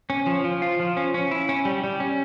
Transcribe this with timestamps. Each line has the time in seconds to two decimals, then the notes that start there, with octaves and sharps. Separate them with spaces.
0.10 C#4
0.26 F3
0.44 F3
0.62 F4
0.80 F3
0.97 C#4
1.14 C#4
1.31 E4
1.49 C#4
1.65 G3
1.84 G3
2.00 C#4